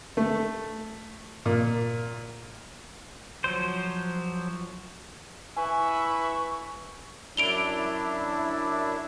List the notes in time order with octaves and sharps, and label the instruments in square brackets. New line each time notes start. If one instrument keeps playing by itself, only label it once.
[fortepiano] A3
A#2
[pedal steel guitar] F3 F#3 C5
[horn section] E4 B4 E5 [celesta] G#5 [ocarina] C#6
[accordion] F#2 D4 E4 [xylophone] D7 F7 G7